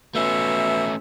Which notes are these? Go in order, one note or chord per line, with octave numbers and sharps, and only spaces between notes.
B2 A3 C#4 E5